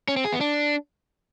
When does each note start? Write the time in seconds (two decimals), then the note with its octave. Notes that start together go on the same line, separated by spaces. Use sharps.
0.08 C#4
0.16 C4
0.25 G#4
0.33 B3
0.41 D4